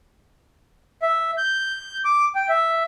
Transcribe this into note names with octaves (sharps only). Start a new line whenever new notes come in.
E5
G6
D6
G5
E5